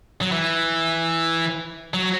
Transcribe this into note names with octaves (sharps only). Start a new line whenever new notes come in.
F#3
E3
F#3